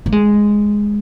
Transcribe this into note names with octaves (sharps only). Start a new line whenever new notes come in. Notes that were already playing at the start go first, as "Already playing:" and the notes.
A#3
G#3